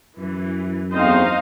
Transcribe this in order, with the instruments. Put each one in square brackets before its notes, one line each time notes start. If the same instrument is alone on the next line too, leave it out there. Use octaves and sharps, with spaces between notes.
[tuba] F#2 [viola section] E3
[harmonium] E2 A3 C4 [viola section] D#4 C5 [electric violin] D#5 F5